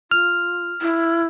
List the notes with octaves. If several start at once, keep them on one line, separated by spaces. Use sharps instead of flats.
F4 F6
E4